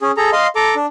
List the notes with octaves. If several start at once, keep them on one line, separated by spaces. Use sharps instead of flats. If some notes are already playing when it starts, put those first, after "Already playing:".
C#4 G#4
G#4 A4 A#5
D#5 F5 C6
A4 A#5 D6
D4